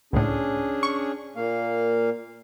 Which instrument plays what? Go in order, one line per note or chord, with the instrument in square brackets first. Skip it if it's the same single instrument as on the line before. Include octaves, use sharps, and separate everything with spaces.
[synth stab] C#2 A2 [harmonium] C#4 D4 G#4
[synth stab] C#6
[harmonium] A#2 A#3 F5